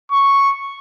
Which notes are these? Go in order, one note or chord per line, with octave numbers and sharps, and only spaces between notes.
C#6